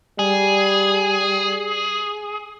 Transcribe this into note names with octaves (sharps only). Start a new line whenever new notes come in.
G3 G#4